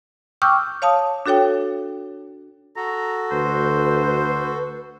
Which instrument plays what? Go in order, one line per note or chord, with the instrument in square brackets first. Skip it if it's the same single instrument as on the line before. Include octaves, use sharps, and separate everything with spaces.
[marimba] G5 C#6 D6 E6 F6 G6
C#5 F5 A5 D#6
D4 F#4 A4 C#5 G5
[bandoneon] F#4 A4 [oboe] A#5
[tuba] D2 [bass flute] B4 [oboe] C5